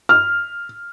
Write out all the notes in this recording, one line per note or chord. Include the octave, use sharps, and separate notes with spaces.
F6